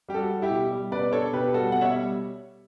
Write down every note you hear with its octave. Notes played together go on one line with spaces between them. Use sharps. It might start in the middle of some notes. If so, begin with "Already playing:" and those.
G3 G4
F#4 A4
G3
E4 G4
B2
G3
B2 B4 D5
D4 A4 C#5
B2 G4 B4
G3 F#4 A4
B2 F#5
C#5 E5
G3